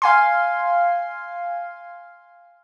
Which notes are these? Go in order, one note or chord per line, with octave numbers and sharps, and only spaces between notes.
F5 G#5 C6